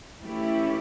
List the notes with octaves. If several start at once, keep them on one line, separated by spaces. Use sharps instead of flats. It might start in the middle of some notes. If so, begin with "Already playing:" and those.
E3 A3 C#4 E4 G4